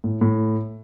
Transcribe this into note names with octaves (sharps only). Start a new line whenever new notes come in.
A2
A2